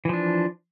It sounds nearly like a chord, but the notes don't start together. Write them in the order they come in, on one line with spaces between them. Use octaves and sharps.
E3 F3 D4